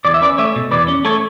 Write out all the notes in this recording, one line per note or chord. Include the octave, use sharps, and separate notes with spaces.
E2 D5
E5
C#4 B4 D5
A3 C#5 E5
B2
E2 B4 D5
C#4
A3 A4 C#5